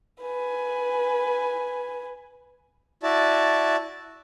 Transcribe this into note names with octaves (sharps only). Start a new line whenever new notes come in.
B4 G#5
E4 F#4 D5 A5